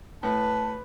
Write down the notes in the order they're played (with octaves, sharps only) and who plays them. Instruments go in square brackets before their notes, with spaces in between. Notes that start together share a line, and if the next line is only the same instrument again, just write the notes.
[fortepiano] A2 [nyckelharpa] B4 [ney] A5